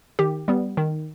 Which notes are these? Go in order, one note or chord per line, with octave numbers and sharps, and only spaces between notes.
D#3 G4
G3 B3
D#3